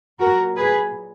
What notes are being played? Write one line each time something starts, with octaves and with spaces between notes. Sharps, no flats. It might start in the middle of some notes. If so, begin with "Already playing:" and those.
A#2 F#3 F#4 A#4
G#4 B4